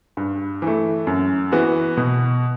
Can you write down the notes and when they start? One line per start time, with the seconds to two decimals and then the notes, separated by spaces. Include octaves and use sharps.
0.17 G2
0.62 E3 A3
1.07 F#2
1.52 E3 B3 F#4
1.97 B2